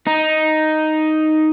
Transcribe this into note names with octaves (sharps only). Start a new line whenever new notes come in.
D#4